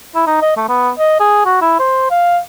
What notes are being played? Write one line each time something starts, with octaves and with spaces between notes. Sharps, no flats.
E4
D#4
D#5
A3
B3
D#5
G#4
F#4
E4
C5
F5